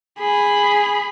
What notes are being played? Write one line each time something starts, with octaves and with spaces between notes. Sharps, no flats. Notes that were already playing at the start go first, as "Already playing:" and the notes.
G#4 B5